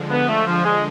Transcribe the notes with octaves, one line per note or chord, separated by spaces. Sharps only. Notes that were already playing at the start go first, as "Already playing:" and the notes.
Already playing: D3 F3 G#3
B3
A3
F3
G#3